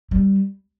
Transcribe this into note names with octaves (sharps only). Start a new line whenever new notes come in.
G3